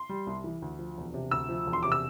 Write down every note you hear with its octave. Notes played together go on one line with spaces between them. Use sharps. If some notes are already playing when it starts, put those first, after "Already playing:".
Already playing: C6
G3
C2
E3
D2
F3
E1
C3
D2 E6
F3
E1
C6
C3 D6
E6